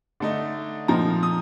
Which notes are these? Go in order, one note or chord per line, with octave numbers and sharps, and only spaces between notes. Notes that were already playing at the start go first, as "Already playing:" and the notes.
D3 A3 D#4
A#2 F3 C4 D#4 A#5
D#6